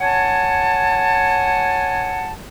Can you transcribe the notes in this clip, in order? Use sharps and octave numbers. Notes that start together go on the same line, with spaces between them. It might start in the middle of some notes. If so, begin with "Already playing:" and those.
C#5 F#5 G#5 A5